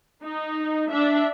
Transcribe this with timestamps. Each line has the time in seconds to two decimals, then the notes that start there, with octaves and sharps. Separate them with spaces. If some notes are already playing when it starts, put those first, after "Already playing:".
0.24 D#4
0.90 D4 E5